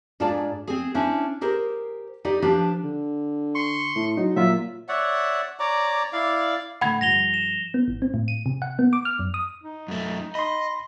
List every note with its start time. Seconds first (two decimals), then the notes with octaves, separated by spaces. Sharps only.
0.20 G#2 D4 F4 G#4 D5 A5
0.68 C4 G#4
0.94 C#4 D4 E4 C5 C#5
1.41 G4 G#4 A#4 C5
2.25 D#4 G4 D5
2.42 F3 D4 G4 B4
2.84 D3
3.55 C6 C#6
3.95 A2
4.17 F#3 D#4
4.36 A#2 F#3 F4 E5
4.89 C#5 D5 E5 F#5
5.60 C#5 D5 A#5 D6
6.13 E4 D5 F5
6.81 A2 D3 A3 F#5 B5 G#6
7.01 G2 F3 G3 A#6 F7 G7
7.34 E7
7.74 B3
7.88 G#1
8.02 C4
8.14 A2
8.28 D#7
8.46 C3
8.62 F#5
8.79 B3
8.93 D6
9.05 F6
9.19 F#2
9.34 D#6
9.62 D#4
9.88 F#2 A3
10.35 D#5 B5 C6